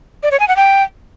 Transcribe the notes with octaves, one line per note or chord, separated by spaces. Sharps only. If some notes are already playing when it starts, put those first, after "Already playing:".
D5
C#5
G#5
F#5
G5